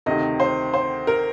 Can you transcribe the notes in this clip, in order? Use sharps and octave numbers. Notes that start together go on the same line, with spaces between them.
D2 C3 D#3 D#5
C5
C5
A#4